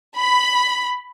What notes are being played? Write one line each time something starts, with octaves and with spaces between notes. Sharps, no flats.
B5